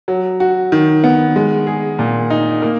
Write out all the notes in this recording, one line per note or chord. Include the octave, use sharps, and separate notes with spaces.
F#3
F#4
D#3
B3
G#3
G#4
A#2
D#4
A#3